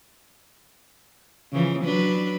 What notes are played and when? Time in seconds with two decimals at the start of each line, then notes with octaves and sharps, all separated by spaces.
1.53 C#3 E3 F3
1.84 F#3 D4 B4